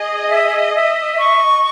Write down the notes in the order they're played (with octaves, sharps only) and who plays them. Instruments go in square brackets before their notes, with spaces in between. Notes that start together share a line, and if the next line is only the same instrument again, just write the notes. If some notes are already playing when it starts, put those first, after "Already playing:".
Already playing: [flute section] G#4 [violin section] D#5
[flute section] E5
E5
C#6